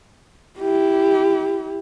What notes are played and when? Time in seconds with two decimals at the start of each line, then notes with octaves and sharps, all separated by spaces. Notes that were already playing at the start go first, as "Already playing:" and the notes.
0.59 E4 G4